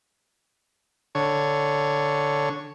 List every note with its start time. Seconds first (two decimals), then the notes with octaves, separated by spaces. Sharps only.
1.15 D3 C#5